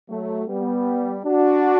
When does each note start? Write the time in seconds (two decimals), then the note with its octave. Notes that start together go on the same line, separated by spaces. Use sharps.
0.09 F#3 A3
0.48 G3 B3
1.25 D4 F#4